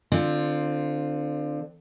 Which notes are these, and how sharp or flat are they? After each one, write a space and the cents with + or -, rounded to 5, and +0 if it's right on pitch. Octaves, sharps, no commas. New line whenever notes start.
D3 +25 C4 +0 F4 +0